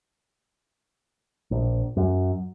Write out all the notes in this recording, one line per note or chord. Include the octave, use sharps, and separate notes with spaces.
A#1
F#2